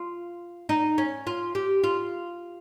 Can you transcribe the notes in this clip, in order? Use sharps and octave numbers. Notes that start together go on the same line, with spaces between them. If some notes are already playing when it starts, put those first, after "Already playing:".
Already playing: F4
D#4
C#4
F4
G4
F4